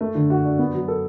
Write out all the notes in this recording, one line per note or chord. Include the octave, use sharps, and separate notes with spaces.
A3
D3
F#4
D4
B3
F#3
A4